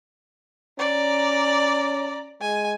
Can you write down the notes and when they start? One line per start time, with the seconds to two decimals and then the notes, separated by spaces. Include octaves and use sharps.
0.79 C#4 D5 A#5
2.41 G#3 G#5